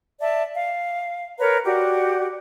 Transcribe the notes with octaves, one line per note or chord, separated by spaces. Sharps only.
D5 E5 A5
F5
A#4 B4 C#5 A#5
F#4 G4 D5 F#5